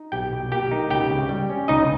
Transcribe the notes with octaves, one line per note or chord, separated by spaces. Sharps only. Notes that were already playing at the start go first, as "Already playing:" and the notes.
Already playing: D#4
B1 G4 G5
B2
A#3 G4 G5
D#4
C#2 G4 G5
C#3
G3
C#4
C#2 D#4 D#5